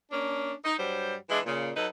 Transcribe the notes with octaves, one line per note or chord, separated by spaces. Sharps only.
A#3 C#4 D4
D#4
G2 F#3 G3 C5
E3 G#3 D4 E4
A#2 C#3
F#3 D#4 A4 B4